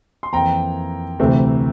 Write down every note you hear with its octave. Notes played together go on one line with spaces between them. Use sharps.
C6
F2 E3 A#3 G5 A#5
D2 C3 E3 A3 C4